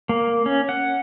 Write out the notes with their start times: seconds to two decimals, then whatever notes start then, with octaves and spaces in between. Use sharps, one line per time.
0.09 A#3
0.46 C#4
0.69 F#5